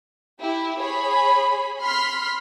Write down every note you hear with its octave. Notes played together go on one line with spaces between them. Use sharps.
E4 G4
G#4 C#5 B5
B5 C6 F6 B6